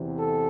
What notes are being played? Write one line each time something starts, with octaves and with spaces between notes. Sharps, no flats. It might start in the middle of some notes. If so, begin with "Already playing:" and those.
Already playing: E2 C3 E3
A4